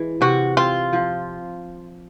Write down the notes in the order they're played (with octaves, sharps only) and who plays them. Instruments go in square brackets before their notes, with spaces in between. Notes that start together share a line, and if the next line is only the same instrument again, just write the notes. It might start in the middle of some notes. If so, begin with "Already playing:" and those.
Already playing: [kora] E3 G#3
[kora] C3 [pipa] F#4
[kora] C4 [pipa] F4
[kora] F3